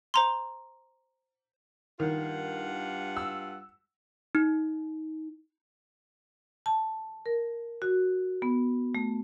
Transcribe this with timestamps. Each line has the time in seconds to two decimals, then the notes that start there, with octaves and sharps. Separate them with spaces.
0.14 C5 A#5 C6
2.00 G2 D#3 F4 F#5
3.17 E6
4.35 D#4
6.66 A5
7.26 A#4
7.82 F#4
8.42 B3
8.95 A3